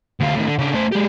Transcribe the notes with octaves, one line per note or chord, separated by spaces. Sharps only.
D2 F4
A2 D#3
D3
C#3 D4
A3 C5
G#3 G4